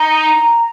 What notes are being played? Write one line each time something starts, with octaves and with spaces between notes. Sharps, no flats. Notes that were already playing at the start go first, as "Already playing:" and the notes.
Already playing: D#4 A#5